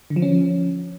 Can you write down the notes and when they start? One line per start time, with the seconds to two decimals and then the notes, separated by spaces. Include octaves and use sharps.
0.10 D3
0.16 F3
0.22 C#4